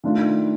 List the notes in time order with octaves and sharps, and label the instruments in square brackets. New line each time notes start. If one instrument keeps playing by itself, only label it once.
[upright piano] D#3 A3 D4 F4